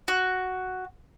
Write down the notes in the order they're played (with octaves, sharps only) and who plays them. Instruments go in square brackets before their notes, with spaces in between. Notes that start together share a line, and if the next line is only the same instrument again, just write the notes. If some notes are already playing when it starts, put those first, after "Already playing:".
[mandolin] F#4